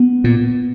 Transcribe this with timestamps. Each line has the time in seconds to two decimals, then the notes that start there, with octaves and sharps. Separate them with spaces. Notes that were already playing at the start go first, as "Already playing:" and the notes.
Already playing: B3
0.24 A#2